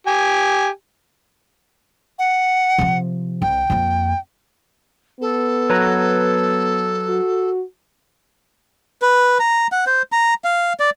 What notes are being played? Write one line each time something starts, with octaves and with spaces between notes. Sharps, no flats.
G4 G#5
F#5
C3 F3
C2 G5
F2 A#3
B3 A4
F#3 B4 A#5
F#4
B4
A#5
F#5
C5
A#5
F5
D5